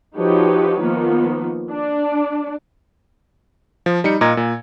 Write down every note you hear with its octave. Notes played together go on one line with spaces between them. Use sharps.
F3 D#4 F#4 G4 B4 C#5
D#3 F3 A#3 B3
D4 D5
F3
G3 D#4 C#7
A#2 A#4 D#5 A#5 G#6
A#2